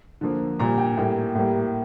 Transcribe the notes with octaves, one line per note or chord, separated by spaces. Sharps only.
D3 F3 A#3
A#2 G3 A#3 A#5
G5
A2 G3 A#3
A2 G3 A#3